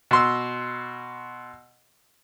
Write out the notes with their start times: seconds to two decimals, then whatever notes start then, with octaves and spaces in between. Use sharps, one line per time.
0.11 B2 C6 E6